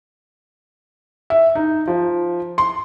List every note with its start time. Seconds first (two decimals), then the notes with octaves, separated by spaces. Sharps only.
1.30 E5
1.55 D#4
1.87 F3
2.58 C6